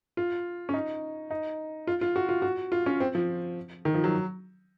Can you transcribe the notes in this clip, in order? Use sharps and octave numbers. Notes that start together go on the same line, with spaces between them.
F4
C#4
D#4
D#4
F4
F4
F#4
F4
F#4
F4
C#4
C4
F3
D#3
F3
F#3